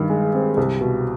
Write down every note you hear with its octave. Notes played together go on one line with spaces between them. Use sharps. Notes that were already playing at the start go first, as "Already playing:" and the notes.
Already playing: G2 D#3
G#3
C4
C2
B2